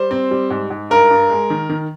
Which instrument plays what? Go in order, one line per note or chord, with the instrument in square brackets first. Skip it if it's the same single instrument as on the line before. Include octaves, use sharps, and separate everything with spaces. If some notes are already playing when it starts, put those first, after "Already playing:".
Already playing: [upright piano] G3 [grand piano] C5
[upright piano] C4
G3
G#2
G#2
[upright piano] G2 [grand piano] A#4
[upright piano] G2
G#3
D#3
D#3